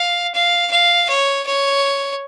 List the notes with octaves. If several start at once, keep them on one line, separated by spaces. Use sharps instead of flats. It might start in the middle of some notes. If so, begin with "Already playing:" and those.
Already playing: F5
F5
F5
C#5
C#5